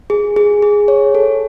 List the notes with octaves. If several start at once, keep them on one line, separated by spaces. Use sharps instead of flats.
G#4
G#4
G#4
C#5
A4